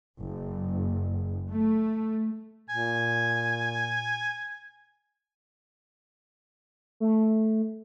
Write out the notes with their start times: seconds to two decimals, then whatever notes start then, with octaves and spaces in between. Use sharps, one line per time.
0.18 F#1
1.52 A3
2.70 A#2 G#5
7.00 A3